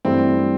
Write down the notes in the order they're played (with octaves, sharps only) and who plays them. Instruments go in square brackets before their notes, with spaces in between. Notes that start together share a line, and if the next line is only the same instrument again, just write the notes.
[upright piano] G2 E3 A3 E4 [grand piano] C4